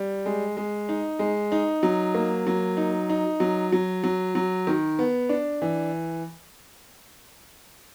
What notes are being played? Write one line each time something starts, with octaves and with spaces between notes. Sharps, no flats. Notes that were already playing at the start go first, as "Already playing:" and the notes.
Already playing: G3
G#3
G#3
D#4
G#3
D#4
F#3
A#3
F#3
D#4
D#4
F#3
F#3
F#3
F#3
D#3
B3
D4
E3